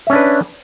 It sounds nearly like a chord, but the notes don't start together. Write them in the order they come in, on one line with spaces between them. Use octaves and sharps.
E5 C#4 D4 B4